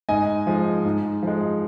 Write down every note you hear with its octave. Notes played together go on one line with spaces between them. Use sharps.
G#2 D#5 G#5
F3 G#3
G#2
F3 G#3